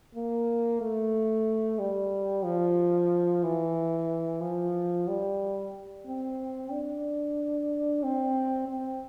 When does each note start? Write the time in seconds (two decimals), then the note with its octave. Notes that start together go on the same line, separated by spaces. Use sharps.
0.15 A#3
0.81 A3
1.79 G3
2.44 F3
3.44 E3
4.41 F3
5.08 G3
6.06 C4
6.71 D4
8.03 C4
8.68 C4